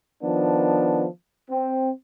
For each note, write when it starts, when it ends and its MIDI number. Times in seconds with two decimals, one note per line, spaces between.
0.23 1.06 51
0.23 1.06 53
0.23 1.06 59
0.23 1.06 62
1.50 1.90 60